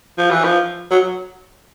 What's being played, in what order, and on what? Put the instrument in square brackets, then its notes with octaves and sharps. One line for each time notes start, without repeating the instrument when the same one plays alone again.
[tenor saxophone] F3
E3
F3
F#3